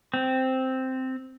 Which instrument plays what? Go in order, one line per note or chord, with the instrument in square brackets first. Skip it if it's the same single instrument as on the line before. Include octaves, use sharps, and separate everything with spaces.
[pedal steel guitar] C4